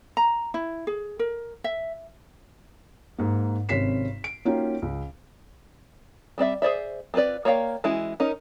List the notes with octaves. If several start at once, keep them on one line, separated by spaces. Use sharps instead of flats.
A#5
E4
G#4
A#4
E5
G#2 A#3
G#1 C3 C#4 B6 C7 E7
D7
A#3 C#4 D#4 F4 F#4 G5
C#2
G3 C4 D5 E5
G#4 C5 D5 E5
C4 F4 G#4 B4 D5
A#3 C#5 D5 F5 G5
E3 G#3 C#4 E4 F#4
C#4 D#4 A#4